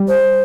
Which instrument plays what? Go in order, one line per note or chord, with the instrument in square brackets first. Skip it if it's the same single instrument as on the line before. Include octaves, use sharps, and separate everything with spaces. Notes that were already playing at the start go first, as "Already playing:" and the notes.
Already playing: [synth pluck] G3
[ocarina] C5